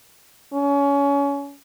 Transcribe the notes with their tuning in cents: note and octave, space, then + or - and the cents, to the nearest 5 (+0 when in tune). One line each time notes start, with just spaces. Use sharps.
C#4 +25